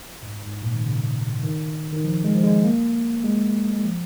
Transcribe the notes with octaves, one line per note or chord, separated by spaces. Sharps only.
G#2
G#2
A#2
D#3
C#3
D#3
D#3
F3
G#3
F3
G#3
A#3
G#3
G#3
F3